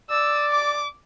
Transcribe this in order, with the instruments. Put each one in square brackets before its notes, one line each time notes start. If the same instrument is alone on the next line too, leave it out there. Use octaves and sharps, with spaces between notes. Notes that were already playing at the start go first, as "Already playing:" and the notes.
[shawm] D5 [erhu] E6
[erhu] D6